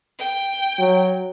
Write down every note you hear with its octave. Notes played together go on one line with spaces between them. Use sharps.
G5
F#3